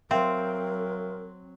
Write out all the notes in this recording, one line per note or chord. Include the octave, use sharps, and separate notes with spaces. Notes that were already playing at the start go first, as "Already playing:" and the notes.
F#3 C4 A#4 E5 F5 C6